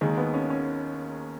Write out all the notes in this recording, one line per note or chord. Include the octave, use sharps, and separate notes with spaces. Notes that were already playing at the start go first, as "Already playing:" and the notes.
D#2 D#3 G#3
B3
C#4
C#4